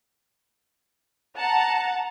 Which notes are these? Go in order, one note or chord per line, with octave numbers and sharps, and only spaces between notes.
F#5 A5 A#5